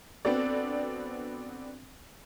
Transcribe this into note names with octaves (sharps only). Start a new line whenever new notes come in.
B3 C4 D4 F#4 A4 D5